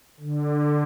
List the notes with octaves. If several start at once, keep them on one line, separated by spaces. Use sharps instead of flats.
D3